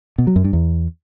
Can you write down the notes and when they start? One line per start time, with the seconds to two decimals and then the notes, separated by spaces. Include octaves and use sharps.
0.18 B2
0.27 F#3
0.36 F#2
0.44 G2
0.53 E2